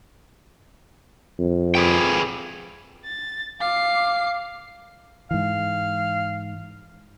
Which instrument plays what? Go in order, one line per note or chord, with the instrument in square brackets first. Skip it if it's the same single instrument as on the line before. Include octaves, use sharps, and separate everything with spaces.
[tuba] F2
[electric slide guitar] G#4 B4 G5
[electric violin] A6
[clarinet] F5 [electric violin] D6 C7
[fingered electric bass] G#2 E3 [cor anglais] F5